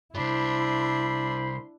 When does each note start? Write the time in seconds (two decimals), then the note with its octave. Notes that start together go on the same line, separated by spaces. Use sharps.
0.15 C2 G2 D4 E4 C5 B5 C6